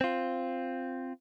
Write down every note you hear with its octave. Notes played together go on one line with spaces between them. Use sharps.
C4 F4